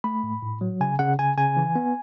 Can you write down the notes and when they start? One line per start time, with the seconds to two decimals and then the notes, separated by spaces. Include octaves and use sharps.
0.04 A3 B5
0.23 A2
0.42 A2
0.61 F#3
0.81 C#3 G#5
0.99 C#3 F#5
1.19 C#3 G#5
1.37 C#3 G#5
1.57 E3
1.76 B3